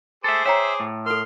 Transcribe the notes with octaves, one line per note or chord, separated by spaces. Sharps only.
G#4 A4 C5 E5 D6
C#5 E5 G5 A#5
A2
A4 A#4 C6 F6